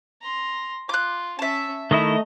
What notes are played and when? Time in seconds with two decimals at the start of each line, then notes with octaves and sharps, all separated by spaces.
0.22 A#5 C6
0.89 F4 D6 F#6
1.39 C#4 E5 A5
1.91 D#3 A3 E4 D#5 A#5